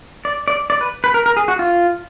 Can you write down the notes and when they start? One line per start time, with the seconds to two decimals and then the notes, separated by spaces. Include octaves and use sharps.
0.25 D5
0.48 D5
0.70 D5
0.81 B4
1.04 B4
1.14 A#4
1.26 A#4
1.37 G#4
1.48 F#4
1.59 F4